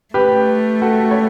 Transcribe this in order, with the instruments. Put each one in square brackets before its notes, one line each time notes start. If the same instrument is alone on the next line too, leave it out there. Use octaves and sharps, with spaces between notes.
[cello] A3 [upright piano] G4 B4
[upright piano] F#4 A4
C#5